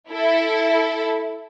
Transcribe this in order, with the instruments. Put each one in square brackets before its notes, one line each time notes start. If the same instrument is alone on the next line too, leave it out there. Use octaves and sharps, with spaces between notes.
[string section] E4 A4